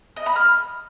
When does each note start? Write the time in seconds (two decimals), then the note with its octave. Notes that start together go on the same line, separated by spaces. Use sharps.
0.16 D#5
0.26 B5
0.36 F6